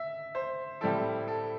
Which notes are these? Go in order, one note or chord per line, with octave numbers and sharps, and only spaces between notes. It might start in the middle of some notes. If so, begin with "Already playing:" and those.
Already playing: E5
C5
A2 G3 C4 E4 A4
A4